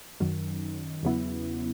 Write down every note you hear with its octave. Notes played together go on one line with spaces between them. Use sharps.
F#2 D#3 F#3
E2 C#3 F#3 B3 E4